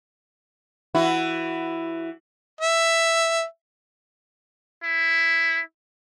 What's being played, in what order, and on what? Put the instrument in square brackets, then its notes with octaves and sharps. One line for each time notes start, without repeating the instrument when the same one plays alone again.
[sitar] E3 E4 F#4
[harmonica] E5
[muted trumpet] E4